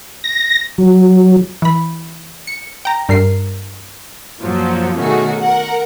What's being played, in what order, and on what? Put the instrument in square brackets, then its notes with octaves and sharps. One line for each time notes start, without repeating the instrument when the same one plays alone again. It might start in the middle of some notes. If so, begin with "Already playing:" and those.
[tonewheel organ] A#6
F#3
[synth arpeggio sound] E3 B5
C#7
G5 A#5
G2 A#4 C7
[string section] F#2 A#2 F3 F#3
B2 D#3 A3 C#4 F#4 G#4
A#4 F#5